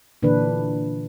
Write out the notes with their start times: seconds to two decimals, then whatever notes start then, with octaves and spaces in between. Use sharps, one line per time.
0.22 A#2 D3 E3 D4 B4